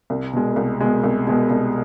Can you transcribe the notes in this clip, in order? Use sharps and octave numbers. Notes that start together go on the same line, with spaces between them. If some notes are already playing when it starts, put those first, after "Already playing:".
C2
B2 G#3
C2
B2 G#3
C2
B2 G#3
C2